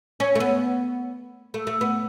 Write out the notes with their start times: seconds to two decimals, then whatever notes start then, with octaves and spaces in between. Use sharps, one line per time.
0.20 C#4
0.35 A3
0.40 B3
1.54 A3
1.67 A3
1.81 B3